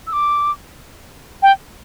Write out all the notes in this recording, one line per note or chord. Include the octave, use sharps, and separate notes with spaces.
E6
D6
G5